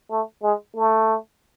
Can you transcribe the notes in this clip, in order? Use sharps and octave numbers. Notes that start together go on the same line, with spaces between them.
A3
G#3
A3